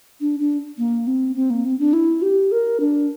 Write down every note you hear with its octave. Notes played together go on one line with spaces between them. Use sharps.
D4
D4
A#3
C4
C4
A#3
C4
D4
E4
G4
A#4
D4